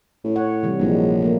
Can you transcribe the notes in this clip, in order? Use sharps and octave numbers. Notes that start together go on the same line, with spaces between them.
A2
C#5 F#5
C3 E3 G3
A#1 F#3 G#3 D4
A3 A#3